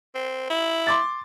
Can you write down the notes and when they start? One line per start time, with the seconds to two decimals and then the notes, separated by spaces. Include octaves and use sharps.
0.15 C4
0.50 E4
0.87 C6 D6 A6